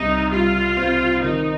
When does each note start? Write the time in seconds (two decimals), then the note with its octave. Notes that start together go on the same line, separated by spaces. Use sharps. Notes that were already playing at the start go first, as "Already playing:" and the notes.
Already playing: C2 C3 D#4
0.31 G3 F4
0.77 C4
1.22 D#3 D#4